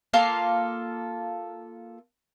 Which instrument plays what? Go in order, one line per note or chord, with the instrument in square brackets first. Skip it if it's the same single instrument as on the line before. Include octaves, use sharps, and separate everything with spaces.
[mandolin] A#3 F4 A4 F5